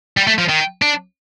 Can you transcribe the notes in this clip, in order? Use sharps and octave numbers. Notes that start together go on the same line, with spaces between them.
G3
A3
F3
D#3
D4